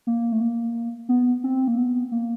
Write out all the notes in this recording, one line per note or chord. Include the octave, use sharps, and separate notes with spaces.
A#3
A3
A#3
B3
C4
A#3
B3
A#3